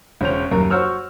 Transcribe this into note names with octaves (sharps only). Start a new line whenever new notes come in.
E1 C#3 C#4 C5 F7
D#1 F#2 A#4
F#4 C5 C#5 E6 F6